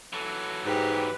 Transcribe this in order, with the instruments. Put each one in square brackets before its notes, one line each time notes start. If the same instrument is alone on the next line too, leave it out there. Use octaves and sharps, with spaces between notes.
[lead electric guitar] E3 F#3 [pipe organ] A4
[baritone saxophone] G#2 [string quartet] G4 [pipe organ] B4